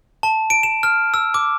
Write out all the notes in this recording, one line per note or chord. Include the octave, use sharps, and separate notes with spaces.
A5
D7
E7
F6
E6
D6